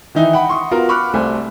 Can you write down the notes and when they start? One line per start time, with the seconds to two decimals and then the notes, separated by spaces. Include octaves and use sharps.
0.15 D#3 E3 D#4 E4
0.33 F#5 G5 B5
0.49 C6 C#6 D#6
0.71 B3 F4 F#4 A#4 F5 A#5
0.89 B5 C#6 D6 F6 F#6
1.13 C2 A3 C5 G#5